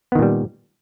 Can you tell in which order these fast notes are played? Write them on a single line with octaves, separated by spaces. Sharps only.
B3 D#3 A#2 G3